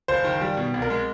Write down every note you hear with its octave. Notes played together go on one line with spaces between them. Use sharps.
F#1 C5
D#3
G3
B2
C2
A#4
G#3